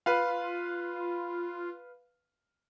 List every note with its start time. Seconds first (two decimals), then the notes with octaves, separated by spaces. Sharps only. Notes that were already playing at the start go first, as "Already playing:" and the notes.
0.06 F4 B4 F5